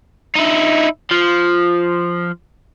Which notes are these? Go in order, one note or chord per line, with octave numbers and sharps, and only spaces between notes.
D#4 E4
F3